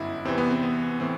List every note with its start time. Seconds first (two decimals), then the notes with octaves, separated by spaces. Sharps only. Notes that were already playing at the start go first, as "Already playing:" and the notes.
Already playing: G1 F#2 E4
0.25 E2 C3 E3 C4
0.38 B3
0.51 C4
0.63 B3
1.00 A2 E3 C4